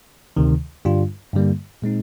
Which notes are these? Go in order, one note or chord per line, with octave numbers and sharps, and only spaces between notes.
D2 C3 D#3
G2 D3 G3 D4 F4
G2 D3 G3 A#3
A#2 G#3 C4 D#4